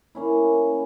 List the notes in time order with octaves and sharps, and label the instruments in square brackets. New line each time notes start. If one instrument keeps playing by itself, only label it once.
[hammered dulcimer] A#3 C#4 E4